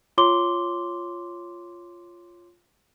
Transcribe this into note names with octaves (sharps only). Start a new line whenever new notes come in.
F4 C#5 C6 D6 G7